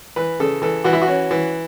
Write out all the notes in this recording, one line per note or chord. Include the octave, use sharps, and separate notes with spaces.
E3 B4
C#3 A4
E3 A4
E3 F#4
E4
F#4
C#4
E3